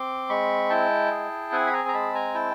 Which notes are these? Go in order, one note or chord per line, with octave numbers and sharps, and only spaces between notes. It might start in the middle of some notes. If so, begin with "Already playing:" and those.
Already playing: C4 C6 D6
G#3 B5 C#6
E4 G5 A5
G#4
C4 F#5 G#5
B5
G#5 A#5
A#5
G#3 A5 B5
G#5 A#5
E4 G5 A5